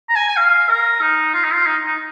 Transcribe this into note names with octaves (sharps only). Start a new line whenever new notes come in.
A#5
G#5
G#5
F5
A#4
D#4
F4
D#4
F4
D#4
D#4